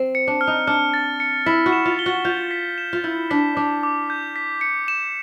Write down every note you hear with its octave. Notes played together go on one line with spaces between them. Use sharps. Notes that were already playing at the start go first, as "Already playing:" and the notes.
Already playing: C4
C#7
D4
F6
D#4
D4 F6
A6
C#7
E4 B6
F#4
E7
F4
G7
F#4
F4 G6
B6
E7
F4
E4 G6
D4 B6
D4 D6
D6
G6
B6
C#7
E7